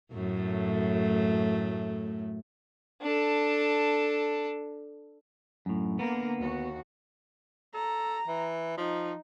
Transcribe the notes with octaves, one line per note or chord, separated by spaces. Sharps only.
F#2 A2 A3
D4 A4
F#2 A2
D3 A#3 B3 A#4
D#2 F#4
A4 A#5
E3
F3 D#4